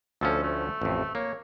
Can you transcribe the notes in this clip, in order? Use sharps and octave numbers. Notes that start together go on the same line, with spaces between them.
D2 F3 C#4 A4
A3
A1 F2
A#3 C#5